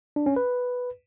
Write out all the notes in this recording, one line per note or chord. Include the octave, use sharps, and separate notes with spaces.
D4
C#4
B4